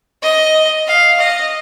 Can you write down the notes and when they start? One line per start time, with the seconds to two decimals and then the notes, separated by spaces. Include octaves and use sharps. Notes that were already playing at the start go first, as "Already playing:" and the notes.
0.23 D#5
0.87 F5
1.19 D#5